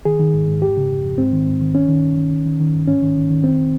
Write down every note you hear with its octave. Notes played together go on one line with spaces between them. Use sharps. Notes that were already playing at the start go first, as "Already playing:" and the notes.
D#3 G#4
D#3
G#2
G#2
F2 G4
C#3
F2
F2
G#2 C4
D#3
G#2
D#3
G2 C#4
D#3
G2
D#3
D#3
D#3
D#3
G2
G#2 C#4
D#3
D#3
D#3
F2 C4